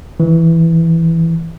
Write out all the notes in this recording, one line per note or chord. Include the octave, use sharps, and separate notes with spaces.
E3